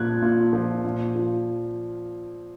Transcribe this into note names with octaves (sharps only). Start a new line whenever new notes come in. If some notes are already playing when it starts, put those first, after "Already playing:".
Already playing: A#2 F3 F#6 G#6
A#2
F3
A#2
F3